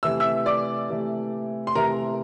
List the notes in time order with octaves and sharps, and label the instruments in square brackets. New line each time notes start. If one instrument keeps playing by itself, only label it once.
[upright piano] C3 E3 A3 [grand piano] E6
[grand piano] E5 E6
D5 D6
[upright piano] C3 E3 A3
[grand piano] C6
[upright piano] C3 E3 A3 [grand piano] A#4 A#5